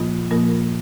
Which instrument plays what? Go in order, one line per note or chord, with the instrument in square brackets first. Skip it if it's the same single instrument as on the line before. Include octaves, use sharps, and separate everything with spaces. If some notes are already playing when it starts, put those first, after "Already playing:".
Already playing: [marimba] A#2 F3 A#3 F4
A#2 F3 A#3 F4 A#4